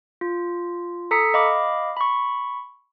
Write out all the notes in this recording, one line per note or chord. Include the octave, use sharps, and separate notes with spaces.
F4
A4 A#5 D#6 B6 C#7
D#5 F5 B5 D6
B5 C#6